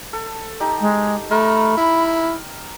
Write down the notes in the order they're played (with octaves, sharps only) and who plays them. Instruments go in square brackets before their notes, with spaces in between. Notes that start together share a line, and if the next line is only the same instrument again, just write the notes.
[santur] A4
D#4 G4
[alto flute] G#3
[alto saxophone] A3 [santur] A#4 [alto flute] B5
[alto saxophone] E4